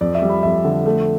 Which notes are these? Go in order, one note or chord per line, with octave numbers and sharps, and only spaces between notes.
F2 D5
E5
G3
B5
F2 E5
D3
A3